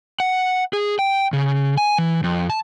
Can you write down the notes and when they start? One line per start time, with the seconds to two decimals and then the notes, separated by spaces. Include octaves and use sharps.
0.20 F#5
0.73 G#4
0.99 G5
1.33 C#3
1.77 G#5
1.98 E3
2.24 F2
2.50 A5